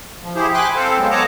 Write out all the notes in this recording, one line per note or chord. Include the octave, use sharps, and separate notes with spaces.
F3
E4 G4 G#4 C5
G5 G#5 B5 C6 D6 F#6
C4 A4 C5 F5
F#3 G#3 B3
C#5 D#5 F#5 A5 A#5 D6